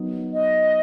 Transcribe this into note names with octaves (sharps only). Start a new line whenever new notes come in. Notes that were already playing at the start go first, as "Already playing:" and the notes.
Already playing: F#3 B3 D#4
D#5